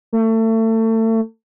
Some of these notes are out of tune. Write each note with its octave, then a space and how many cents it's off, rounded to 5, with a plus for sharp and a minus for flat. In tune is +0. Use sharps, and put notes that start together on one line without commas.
A3 +30